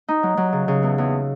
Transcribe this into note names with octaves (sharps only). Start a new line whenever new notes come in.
D#4
F#3
F#3
C#3
C#3
E2
E2